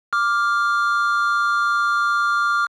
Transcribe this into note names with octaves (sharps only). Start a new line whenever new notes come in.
D6 F6